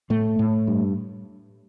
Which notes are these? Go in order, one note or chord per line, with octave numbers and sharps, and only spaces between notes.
A2 A3
A2
G2